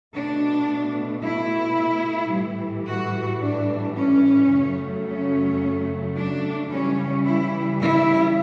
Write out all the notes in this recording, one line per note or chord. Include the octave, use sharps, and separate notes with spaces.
B2 A3 D4
E4
A2 E3 G3
F#4
D4
C#4
F#2 C#3 F#3 A3
C#4
D4
C#3 E3 G3 C#4
E4
E4